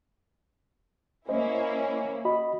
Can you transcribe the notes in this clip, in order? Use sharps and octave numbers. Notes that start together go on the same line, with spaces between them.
A#3 C#4 E4 C5 D#5
F#4 D#5 B5